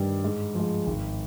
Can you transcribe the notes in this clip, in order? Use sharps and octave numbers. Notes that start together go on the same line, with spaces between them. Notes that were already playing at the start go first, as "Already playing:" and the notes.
Already playing: G2 D#3 G3
G#2
F3 G#3
G#1